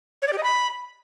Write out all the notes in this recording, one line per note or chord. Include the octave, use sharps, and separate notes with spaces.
C#5
D5
G4
D#5
B5